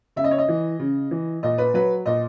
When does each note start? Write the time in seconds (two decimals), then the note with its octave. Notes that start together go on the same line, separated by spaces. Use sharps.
0.16 C#3 E5
0.24 D#5
0.31 C#5
0.38 D#5
0.49 E3
0.80 C#3
1.11 E3
1.43 A#2 D#5
1.58 B4
1.74 F#3 B4
2.06 A#2 D#5